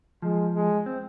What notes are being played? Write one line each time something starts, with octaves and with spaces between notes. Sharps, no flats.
F3 G#3
G#3
C4